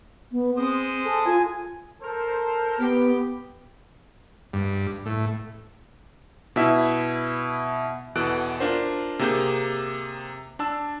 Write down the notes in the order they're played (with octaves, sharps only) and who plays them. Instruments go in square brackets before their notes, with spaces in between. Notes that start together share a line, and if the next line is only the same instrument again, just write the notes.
[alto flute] B3
[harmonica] G#3 C5 D#6 [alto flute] C4
[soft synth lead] A4 [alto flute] G#5
[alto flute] F4 [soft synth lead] G#5
[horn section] A4 A#4 C5
[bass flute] B3 [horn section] G4
[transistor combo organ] G2
A2
[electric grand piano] B2 E4 E5
E2 B2 E3 A4 F#6 D7
D4 F4 A#4 C5
C3 A#3 G4 G#4 G6
D4 A5 E6